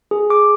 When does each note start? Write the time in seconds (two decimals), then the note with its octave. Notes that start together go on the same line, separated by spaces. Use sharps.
0.11 G#4
0.30 D6